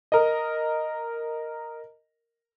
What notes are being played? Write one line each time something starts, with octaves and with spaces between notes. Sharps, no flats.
A#4 D#5